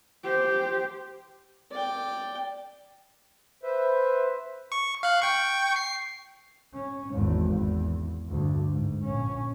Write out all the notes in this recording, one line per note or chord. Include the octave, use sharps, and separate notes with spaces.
G4 C5
D5 G5
B4 C5 E5
C#6
F5 F#6
G5 C#6
C7
C#4
G#1 E2
E2
D2 G2
G#2
A#1 C#4